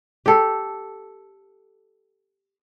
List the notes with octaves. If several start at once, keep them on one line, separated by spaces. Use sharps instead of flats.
G4 A4